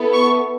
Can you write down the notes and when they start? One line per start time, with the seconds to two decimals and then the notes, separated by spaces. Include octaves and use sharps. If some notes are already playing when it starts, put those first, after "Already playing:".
Already playing: B3 E4 A4
0.14 C#6